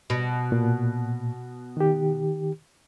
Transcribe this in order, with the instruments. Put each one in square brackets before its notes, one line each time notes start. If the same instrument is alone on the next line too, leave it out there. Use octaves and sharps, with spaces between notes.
[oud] B2
[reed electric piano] A#2
D#3 G4